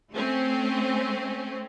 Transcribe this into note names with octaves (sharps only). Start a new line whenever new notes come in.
A3 C4 C#4